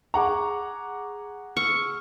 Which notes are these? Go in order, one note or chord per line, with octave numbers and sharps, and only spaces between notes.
G#4 F#5 A#5 C#6 D6
C#6 E6 F6